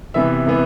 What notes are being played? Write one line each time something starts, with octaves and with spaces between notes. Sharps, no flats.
C3 E3 B3 E5
C3 E3 B3